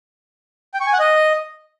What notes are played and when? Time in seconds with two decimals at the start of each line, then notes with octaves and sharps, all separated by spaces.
0.74 G5
0.80 C#6
0.87 G#5
0.93 F#5
0.99 D#5